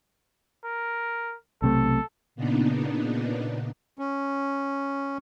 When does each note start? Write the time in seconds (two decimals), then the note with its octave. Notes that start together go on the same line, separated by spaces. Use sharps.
0.64 A#4
1.62 B1 C3 A3 A4
2.35 A#2 C#3 B3 D4 D#4
3.99 C#4